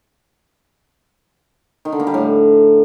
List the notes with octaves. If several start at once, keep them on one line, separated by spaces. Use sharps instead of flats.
D#3
D3
A#3
G3
A2